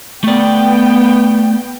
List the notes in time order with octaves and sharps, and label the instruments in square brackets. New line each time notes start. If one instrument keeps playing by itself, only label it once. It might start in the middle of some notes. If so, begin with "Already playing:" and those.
[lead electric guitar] A3 D5 [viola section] B3 G5